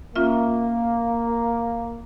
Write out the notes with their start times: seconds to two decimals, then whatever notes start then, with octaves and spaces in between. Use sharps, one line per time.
0.16 A#3 C#4 F4 E5